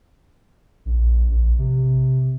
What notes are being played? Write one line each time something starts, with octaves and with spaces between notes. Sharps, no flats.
A#1
A#1
C3